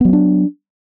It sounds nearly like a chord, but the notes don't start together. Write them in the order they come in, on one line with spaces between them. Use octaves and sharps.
B3 F#3 C4 D4